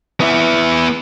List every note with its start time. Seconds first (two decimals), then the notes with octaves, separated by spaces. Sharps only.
0.21 B3 E4